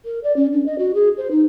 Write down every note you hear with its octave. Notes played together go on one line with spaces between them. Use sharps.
A#4
D5
C#4
D4
D#5
F#4
G#4
C5
D#4